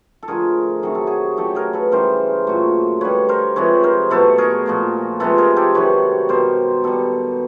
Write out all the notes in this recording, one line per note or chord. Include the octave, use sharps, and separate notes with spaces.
A4
D3 F3 A3 G#4 A#4
C3 D#3 F#3 G#4
A4
F#4 G#4
C#3 F#3 A3 G4 A4
G#4 A#4
A4 B4
C#3 E3 G3 A#4 C5
A#2 F#3 A3
D3 G3 B4 C#5
A#4 C5
C3 F3 G#3 B4 C#5
A#4 C5
B2 F#3 A3 A4 B4
G#4 A#4
A#2 F3 A3
C3 F3 G#3 A4 B4
G#4 A#4
G4 A4
C3 D#3 F#3 B4 C#5
B2 G3 A#4 C5
B2 G3 A4 B4